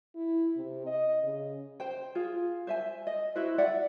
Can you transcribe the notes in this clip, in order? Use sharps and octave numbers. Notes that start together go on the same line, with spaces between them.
E4
C3
D#5
C#3
C5 G5
F4 G#4
C5 E5 G#5
D#5
E4 F#4 B4 C5
D5 E5 F#5